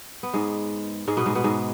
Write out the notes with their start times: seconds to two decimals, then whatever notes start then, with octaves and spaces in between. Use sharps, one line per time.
0.23 B3
0.33 G#2 G#3
1.08 G#2 G#3
1.17 B2 B3
1.26 G#2 G#3
1.35 B2 B3
1.44 G#2 G#3